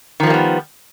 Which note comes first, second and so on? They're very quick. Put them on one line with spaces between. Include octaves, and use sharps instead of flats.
D#3 F3 A#3 G3 B3